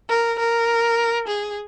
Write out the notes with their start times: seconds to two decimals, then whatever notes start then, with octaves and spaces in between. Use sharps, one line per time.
0.09 A#4
0.39 A#4
1.27 G#4